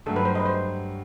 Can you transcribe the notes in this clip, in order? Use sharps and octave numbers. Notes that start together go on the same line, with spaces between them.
G2 F#3 A3 A4
B4
C5
D#5
B4
C5